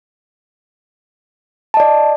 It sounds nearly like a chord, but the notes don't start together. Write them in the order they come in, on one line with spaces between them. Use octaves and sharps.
A5 D#5 D5